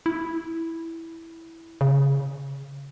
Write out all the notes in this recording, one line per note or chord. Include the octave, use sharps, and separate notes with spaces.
E4
C#3